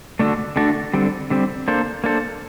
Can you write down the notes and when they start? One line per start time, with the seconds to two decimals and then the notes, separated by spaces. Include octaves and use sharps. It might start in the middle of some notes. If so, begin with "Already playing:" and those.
0.19 D3 A3 D4 F#4 A4
0.56 D3 A3 D4 F#4 A4
0.94 D3 G3 C4
1.30 D3 G3 C4
1.68 A#3 D4 A4 C5
2.04 A#3 D4 A4 C5